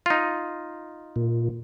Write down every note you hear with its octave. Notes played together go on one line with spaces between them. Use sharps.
D#4 F4
A#2